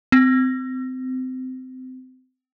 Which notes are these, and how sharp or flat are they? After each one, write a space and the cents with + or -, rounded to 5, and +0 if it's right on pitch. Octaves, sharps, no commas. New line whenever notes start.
C4 -25